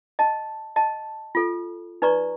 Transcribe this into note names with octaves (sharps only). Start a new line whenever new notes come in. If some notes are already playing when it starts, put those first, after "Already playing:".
D#5 A5
D#5 A5
F4 A4
D#4 B4 D5 A#5 C#6